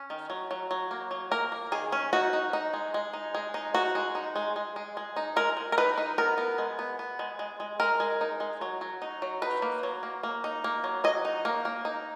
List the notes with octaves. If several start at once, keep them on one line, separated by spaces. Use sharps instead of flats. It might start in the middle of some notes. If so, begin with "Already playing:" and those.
Already playing: C#4
D#3
F#3
F#3
F#3
A#3
F#3
A#3 A#4
A#3
D#3 G#4
C#4
D#4 F#4
D#4
D#4
G#3
G#3
D#4
G#3
D#4
D#4 F#4
G#3
D#4
G#3
G#3
G#3
G#3
D#4
G#3 A#4
G#3
A#4
D#4 B4
D#4
B3 A#4
B3
G#3
B3
B3
G#3
G#3
G#3
G#3 A#4
G#3
D#4
G#3
F#3
F#3
D#4
F#3
D#4 B4
A#3
F#3
A#3
A#3
D#4
A#3
F#3
F#3 D#5
D#4
A#3
A#3
D#4